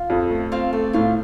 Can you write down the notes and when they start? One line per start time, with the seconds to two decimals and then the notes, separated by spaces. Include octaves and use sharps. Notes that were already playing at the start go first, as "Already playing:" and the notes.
Already playing: F4 F5
0.10 F2
0.31 A3
0.52 C4 F4 F5
0.73 A3 D5
0.93 A2 F4 F5